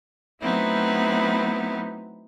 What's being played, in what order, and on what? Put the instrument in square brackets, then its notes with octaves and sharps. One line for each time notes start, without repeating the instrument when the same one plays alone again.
[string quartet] F#3 A3 B3 C4 D#4 E4